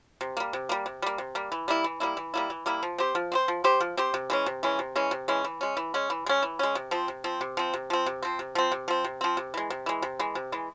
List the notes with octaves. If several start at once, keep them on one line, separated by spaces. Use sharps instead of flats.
C3
G3 A#3
C3
G3 A#3
C3
G3 A#3
C3
G3 A#3
E3
G3 A#3 E4
E3
G3 A#3 E4
E3
G3 A#3 E4
E3
G3 A#3 E4
F3
C4 G4 C5
F3
C4 G4 C5
F3
C4 G4 C5
F3
C4 G4 C5
C3
E3 G#3 C#4
C3
E3 G#3 C#4
C3
E3 G#3 C#4
C3
E3 G#3 C#4
E3
G#3 C#4
E3
G#3 C#4
E3
G#3 C#4
E3
G#3 C#4
C3
F3 C4
C3
F3 C4
C3
F3 C4
C3
F3 C4
C3
F3 C4
C3
F3 C4
C3
F3 C4
C3
F3 C4
C3
E3 G#3
C3
E3 G#3
C3
E3 G#3
C3
E3 G#3